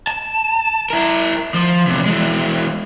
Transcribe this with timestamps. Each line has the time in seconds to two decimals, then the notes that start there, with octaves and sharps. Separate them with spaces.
0.07 A5
0.90 E4 A#4
1.54 F3
1.87 E2 C3
2.06 E3 G#3